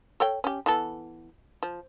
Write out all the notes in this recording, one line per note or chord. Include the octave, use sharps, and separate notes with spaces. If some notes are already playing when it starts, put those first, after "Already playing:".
A4 C#5 G5
C#4 G4
E3 B3 A4
F3